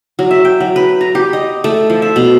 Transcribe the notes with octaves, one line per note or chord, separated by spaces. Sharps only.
F#3
E5
G5
F#3
B4
A#5
G4
D#5
A3
F3
E5
B2